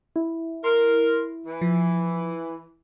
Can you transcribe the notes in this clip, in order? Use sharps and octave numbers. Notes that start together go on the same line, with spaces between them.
E4
A#4 C6
E3
F3